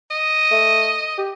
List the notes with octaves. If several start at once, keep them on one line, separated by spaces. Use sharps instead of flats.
D#5
A3
G4